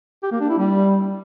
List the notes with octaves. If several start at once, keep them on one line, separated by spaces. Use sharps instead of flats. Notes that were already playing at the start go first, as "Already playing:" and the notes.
G4
A#3
D4
E4
G3